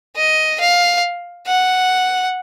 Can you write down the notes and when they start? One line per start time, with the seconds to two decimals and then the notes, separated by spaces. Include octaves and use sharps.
0.17 D#5
0.60 F5
1.47 F#5